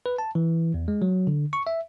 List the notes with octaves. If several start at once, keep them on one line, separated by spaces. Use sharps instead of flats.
B4
A5
E3
E2
G#3
F#3
D3
C#6
E5